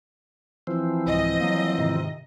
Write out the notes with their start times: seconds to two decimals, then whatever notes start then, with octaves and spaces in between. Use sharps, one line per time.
0.67 E3 F3 C4
1.07 C2 G#2 D#5
1.40 F#3 A#3
1.78 G#2 C3 D#3